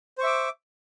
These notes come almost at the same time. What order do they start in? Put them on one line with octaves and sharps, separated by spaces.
C5 C#6 E5 D6